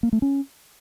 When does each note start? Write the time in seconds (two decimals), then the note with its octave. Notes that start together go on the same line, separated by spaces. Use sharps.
0.03 A#3
0.13 A3
0.22 C#4